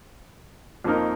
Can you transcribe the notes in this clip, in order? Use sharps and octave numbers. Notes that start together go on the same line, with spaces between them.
F2 F3 A#3 D#4 A#4